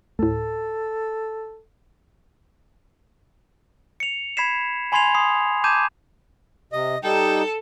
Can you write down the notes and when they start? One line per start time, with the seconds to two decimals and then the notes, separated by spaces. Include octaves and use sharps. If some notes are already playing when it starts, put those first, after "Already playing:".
0.19 D2 A2 A4
4.00 C#7 F7
4.37 B5 G#6 B6 C7 E7
4.92 G#5 B5 C6 G#6 C7 F7
5.15 C6 D#6 C7
5.64 A5 D6 G6 G#6 D#7 E7
6.73 C3 D#5
7.03 G3 D#4 A4 G5